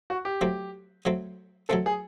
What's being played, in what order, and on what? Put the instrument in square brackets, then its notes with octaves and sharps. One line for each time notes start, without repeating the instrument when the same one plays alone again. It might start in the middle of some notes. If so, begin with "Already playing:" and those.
[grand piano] F#4
G4
[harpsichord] F#3 A3 C4
F#3 A3 C4
[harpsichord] F#3 A3 C4 [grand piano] A4
[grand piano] G#4